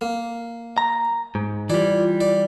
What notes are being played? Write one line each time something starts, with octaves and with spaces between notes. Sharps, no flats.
A#3
A#5
G#2
E3 G3 F4 D5
D5